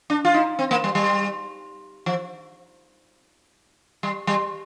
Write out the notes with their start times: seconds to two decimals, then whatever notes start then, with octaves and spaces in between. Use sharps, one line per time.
0.10 D4
0.25 F4
0.34 D#4
0.59 C4
0.71 A#3
0.84 G3
0.95 G3
2.06 F3
4.03 G3
4.27 G3